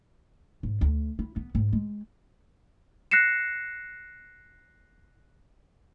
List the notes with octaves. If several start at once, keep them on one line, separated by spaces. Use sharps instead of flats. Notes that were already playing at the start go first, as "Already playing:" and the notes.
G#2
D2
E4
B3
G#2
G#3
F#6 A#6 C7 C#7 E7